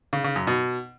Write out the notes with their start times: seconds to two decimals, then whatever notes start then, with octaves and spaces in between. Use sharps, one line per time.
0.13 C#3
0.24 C#3
0.36 F#2
0.47 B2